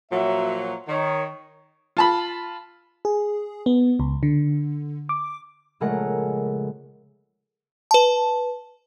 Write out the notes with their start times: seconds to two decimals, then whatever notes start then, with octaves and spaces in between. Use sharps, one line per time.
0.11 A#2 F3 F#3 E5
0.88 D#3 C#5
1.97 F4 A5 B5
3.05 G#4
3.66 B3
4.00 C#2
4.23 D3
5.09 D6
5.80 A#1 C#3 G#3 A3 A#4 F#5
7.91 B4 A5